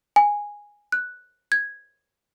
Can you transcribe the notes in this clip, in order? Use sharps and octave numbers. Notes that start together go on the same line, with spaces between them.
G#5
F#6
G#6